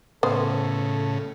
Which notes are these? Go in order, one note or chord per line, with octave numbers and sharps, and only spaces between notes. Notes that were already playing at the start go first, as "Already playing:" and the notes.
A2 C#3 B3 A4 C5